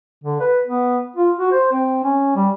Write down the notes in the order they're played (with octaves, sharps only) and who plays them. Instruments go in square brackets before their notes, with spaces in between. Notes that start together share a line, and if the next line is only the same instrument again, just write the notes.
[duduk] D3
B4
B3
F4
F#4
C5
C4
C#4
G3